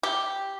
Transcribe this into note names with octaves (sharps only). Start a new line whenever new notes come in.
G4